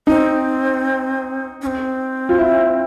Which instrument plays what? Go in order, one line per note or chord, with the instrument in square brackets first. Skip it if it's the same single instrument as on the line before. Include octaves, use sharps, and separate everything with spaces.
[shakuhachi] C4 [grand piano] D#4
[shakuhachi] C#4
C4
[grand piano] F4
E4